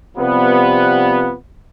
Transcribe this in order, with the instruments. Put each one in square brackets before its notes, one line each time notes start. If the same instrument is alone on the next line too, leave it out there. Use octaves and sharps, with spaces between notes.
[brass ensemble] C3 F3 G3 B3